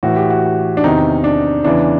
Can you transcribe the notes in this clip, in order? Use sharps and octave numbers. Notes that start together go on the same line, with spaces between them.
A2 E3 F#4
G4
F#4
D4
E2 C3 D#3 D#4
D4
E2 C#3 E3 D4